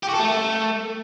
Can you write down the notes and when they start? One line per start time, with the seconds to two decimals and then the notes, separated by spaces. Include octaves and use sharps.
0.03 G4
0.08 F#4
0.14 A4
0.19 A3